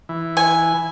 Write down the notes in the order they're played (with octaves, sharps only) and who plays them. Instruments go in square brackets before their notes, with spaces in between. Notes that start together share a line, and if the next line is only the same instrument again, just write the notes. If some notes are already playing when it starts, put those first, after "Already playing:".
[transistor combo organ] E3
[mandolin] G#5